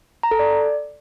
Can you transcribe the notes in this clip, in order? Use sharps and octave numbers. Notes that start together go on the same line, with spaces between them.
A#5
A4
D5